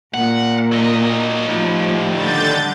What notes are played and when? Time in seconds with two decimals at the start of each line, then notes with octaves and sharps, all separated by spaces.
0.14 A#2 F#5
0.72 F#3 D#5
1.48 A2 D#3 F3 G3
2.12 D3 G6 A6